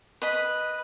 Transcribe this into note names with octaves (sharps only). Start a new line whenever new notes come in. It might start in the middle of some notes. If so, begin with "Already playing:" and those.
B4 D#5 B5